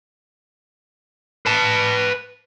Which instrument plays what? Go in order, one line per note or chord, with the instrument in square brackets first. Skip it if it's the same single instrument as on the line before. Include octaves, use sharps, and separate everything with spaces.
[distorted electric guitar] B4 A5